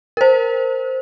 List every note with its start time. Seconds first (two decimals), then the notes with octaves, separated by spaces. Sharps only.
0.17 A#4 C5